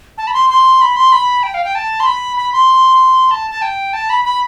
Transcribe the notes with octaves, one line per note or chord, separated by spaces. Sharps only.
A5
B5
C6
C6
B5
C6
B5
G5
F5
G5
A5
C6
B5
B5
C6
A5
A5
G5
A5
B5
B5